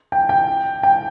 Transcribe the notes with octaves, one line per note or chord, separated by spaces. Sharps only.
G5
G5
G5